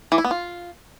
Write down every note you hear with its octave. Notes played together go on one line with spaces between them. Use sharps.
E3
E4
B3
F4